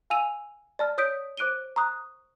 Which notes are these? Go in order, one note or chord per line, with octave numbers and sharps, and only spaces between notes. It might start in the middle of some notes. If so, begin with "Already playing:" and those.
F5 G#5 E6 D#7 F7
D5 A5 F6
C#5 D#6 G6 B6 D7
C5 D6 F#6 D7 D#7 G7
A#5 C#6 D#6 F#6